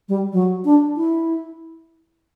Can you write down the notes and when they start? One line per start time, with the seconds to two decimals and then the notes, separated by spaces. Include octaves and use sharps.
0.09 G3
0.33 F#3
0.65 D4
0.96 E4